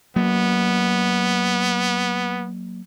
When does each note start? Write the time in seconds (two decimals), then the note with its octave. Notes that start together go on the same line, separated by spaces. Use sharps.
0.16 F#3 A#3 B3